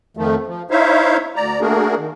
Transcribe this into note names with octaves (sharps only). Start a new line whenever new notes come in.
F2 D#3 F3 A3
F3
D#4 E4 C5 C#5 E5 F5
D2 D5 A#5
A3 A#3 D4 F#4 G#4 A#4
D#3